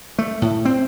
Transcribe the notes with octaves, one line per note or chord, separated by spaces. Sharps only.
A3
A2
C4